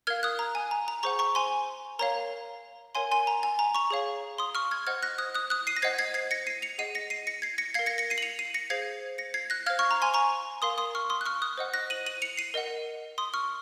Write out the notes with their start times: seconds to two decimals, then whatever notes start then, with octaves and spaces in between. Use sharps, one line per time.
0.07 A#4 F5 F6 G#6
0.23 D#6 F#6
0.39 A#5
0.55 G#5
0.71 A#5
0.88 A#5
1.03 G#4 C5 F#5 A#5 C#6
1.19 A#5 C#6
1.35 G#5 C6
1.99 A#4 C#5 F5 A#5
2.95 A#4 C#5 F5 G#5 C6
3.11 G#5 C6
3.27 A#5
3.43 G#5
3.59 A#5
3.75 A#5 C#6
3.90 G#4 C#5 F5
4.38 C6 D#6
4.55 C#6 F6
4.71 F6 G#6
4.87 C5 D#5 F#5 F6 G#6
5.03 F#6 A#6
5.18 D#6 F#6
5.35 D#6 F#6
5.50 D#6 F#6
5.67 C7 D#7
5.76 A#6
5.82 C5 D#5 F#5 G#6 C7
5.98 G#6 C7
6.14 G#6 C7
6.31 A#6 C#7
6.47 C7 D#7
6.62 C#7 F7
6.78 G#4 D#5 F#5 C7 D#7
6.95 A#6 C#7
7.10 C7 D#7
7.27 A#6 C#7
7.42 G#6 C7
7.58 A#6 C#7
7.74 A#4 F5 G#6 C7
7.86 A#6 C#7
7.98 A#6 C#7
8.10 C7 D#7
8.18 F#7
8.22 C#7 F7
8.39 C7 D#7
8.54 A#6 C#7
8.70 G#4 C5 F5 G#6 C7
9.18 A#6 C#7
9.34 G#6 C7
9.50 F#6 A#6
9.66 C5 F5 F6 G#6
9.79 C#6 F6
9.91 A#5
10.02 G#5 C6
10.14 A#5 C#6
10.62 A#4 F5 C6 D#6
10.78 C6 D#6
10.95 C#6 F6
11.10 C6 D#6
11.21 F#6
11.26 C#6 F6
11.42 D#6 F#6
11.58 C5 D#5 F#5
11.74 F#6 A#6
11.90 D#7 F#7
12.06 D#7 F#7
12.22 C#7 F7
12.37 C7 D#7
12.54 A#4 D#5 F#5
13.18 C6 D#6
13.34 C#6 F6